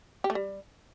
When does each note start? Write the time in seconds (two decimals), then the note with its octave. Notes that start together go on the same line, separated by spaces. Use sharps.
0.24 G4
0.30 A3
0.35 G3